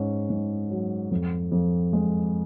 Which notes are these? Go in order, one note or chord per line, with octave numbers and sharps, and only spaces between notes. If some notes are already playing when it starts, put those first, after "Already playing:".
Already playing: G#2 C#4
G#2
F#3
F2
F2
G#3